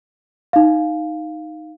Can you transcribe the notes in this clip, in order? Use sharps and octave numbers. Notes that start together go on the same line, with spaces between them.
D#4 F5